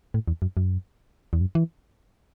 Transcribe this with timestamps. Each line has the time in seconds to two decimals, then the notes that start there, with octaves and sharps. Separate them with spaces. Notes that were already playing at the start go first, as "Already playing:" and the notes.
0.14 A2
0.28 E2
0.42 F#2
0.57 F#2
1.33 E2
1.41 F#2
1.55 E3